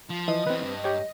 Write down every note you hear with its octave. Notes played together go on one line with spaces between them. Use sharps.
F3
E3 D#5
E2 E3 C4 B4
G2
G4 C#5